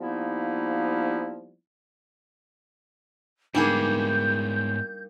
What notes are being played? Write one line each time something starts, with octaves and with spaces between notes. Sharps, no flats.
F3 G3 A#3 B3 D#4 E4
G#2 G3 A#3 B3 D4 D#4 G#4 G6